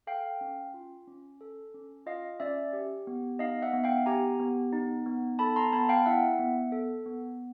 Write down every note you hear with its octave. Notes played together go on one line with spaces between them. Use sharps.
A4 F5 G5
C#4
F4
C#4
A4
C#4
F4 D#5 F5
C#4 D5 E5
G4
B3
D#4 D#5 F5
E5 F#5
B3
F5 G5
G4 G#5 A#5
B3
D#4
B3
A4 A5 B5
A#5 C6
B3 A5 B5
F5 G5
E4 E5 F#5
B3
A4
B3